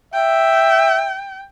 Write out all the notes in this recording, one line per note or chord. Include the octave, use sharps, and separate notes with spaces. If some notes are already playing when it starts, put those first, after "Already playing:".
E5 G5